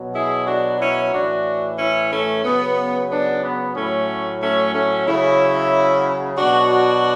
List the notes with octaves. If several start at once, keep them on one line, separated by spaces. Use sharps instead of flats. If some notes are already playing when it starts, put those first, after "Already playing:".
Already playing: B2 F#3
E4 G#4
D4 F#4
C#4 E4
A2 E3 D4 F#4
C#4 E4
A3 C#4
C#3 F#3 B3
B3 D4
B3
A2 F#3 A3 C#4
A3 C#4
A3 C#4
C#3 F#3 C#4 E4
B2 F#3 D4 F#4